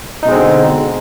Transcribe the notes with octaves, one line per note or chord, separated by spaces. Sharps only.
B2 D3 G#3 C4 D#4